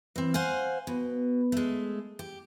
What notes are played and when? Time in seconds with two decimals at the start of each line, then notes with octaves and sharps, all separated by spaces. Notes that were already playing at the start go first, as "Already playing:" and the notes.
0.16 E3 C4
0.34 C5 F5 F#5 G#5
0.87 B2
1.52 G#3 A3
2.19 G4